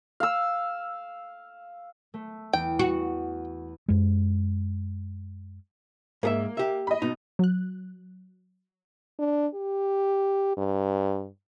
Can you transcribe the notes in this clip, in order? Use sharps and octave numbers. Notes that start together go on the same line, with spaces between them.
F5 E6
A3
E2 G5
F#4
F#2 G#3
G#2 A#3 G#4 E5
G4 E5
D#5 B5
B2 D#4
F#3 F#6
D4
G4
G2